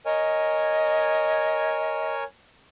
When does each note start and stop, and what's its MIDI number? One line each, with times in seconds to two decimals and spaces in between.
0.05 2.24 70
0.05 2.24 73
0.05 2.14 75
0.05 2.24 80